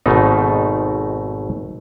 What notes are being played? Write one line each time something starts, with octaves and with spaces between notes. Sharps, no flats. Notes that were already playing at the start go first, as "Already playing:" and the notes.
G#1 G#2 B2 A3 D#4